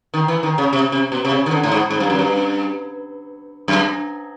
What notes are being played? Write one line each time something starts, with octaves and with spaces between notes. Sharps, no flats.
D#3
E3
D#3
C#3
C3
C3
B2
C3
C#3
D#3
D3
A2
G#2
G#2
G2
F#2
G2
F#2